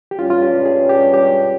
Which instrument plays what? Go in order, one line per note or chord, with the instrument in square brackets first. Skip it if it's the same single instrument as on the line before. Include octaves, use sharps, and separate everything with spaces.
[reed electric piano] G4
[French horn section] G2 G3 C#4 [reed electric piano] F4
[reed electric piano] F4
G4
G#4
G4
G4